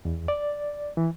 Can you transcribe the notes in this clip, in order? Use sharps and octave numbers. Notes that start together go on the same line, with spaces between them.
E2
D5
E3